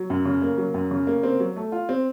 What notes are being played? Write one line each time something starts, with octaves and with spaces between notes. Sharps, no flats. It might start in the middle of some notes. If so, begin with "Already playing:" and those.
Already playing: F#3
F#2
C#3
A#3
F#3
F#2
C#3
A#3
C4
F#3
A3
F4
C4